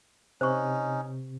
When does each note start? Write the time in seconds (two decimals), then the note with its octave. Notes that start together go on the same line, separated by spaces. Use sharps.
0.41 C3 C#4 D#4 C5 C#6